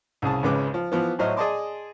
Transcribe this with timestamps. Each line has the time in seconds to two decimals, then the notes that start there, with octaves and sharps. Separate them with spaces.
0.22 C2 C#3 G#4 A5
0.43 G#1 C#2 C#3 G#3 B4 D6
0.74 F3
0.92 E3 F3 B3
1.19 A2 F#3 C5 D#5 E5 F6
1.36 G#4 D5 D#5 A5 C6 D6